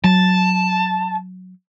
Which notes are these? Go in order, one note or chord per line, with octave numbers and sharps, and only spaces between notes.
F#3 A5